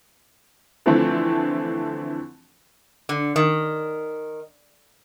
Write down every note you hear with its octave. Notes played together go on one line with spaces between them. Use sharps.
D3 E3 F3 A3 C4
D3
D#3